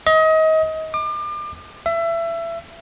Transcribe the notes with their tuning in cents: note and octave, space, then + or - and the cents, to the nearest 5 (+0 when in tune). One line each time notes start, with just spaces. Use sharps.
D#5 +30
D6 +35
E5 +25